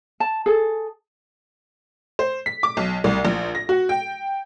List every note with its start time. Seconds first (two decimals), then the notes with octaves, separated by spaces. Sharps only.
0.20 A5
0.46 G#4 A4
2.19 C5
2.46 B6
2.63 D6
2.77 B1
3.04 C2
3.25 A#1
3.55 A#6
3.69 F#4
3.89 G5